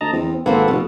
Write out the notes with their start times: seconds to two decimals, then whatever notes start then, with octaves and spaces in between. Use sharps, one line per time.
0.01 D2 D#5 A5 A#5
0.13 E2 C4
0.46 G#1 A#3 C4 A4 B4 F#5
0.68 F1 B2